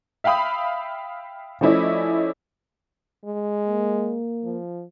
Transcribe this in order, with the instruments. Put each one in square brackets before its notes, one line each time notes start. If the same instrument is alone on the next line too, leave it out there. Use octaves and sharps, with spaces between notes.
[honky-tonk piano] E5 F5 G5 B5 D#6
F3 A3 C#4 E4 D5 D#5
[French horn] G#3
[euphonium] A#3
[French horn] F3